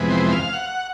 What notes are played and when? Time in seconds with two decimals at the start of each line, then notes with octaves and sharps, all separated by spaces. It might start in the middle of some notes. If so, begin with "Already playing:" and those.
Already playing: F2 C3 E3 G#3 B3
0.10 C5
0.32 F5
0.53 F#5